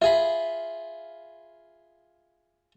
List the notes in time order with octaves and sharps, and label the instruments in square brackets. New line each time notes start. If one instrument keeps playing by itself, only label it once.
[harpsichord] F4 G#4 B5 [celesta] E5